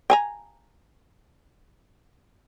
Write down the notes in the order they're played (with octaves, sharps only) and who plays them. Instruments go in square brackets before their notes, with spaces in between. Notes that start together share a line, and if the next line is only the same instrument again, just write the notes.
[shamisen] G5 G#5 A#5